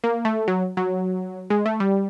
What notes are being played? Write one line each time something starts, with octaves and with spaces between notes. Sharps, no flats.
A#3
A3
F#3
F#3
G#3
A3
G3